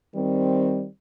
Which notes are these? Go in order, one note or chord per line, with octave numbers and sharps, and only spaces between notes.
D#3 G3 C4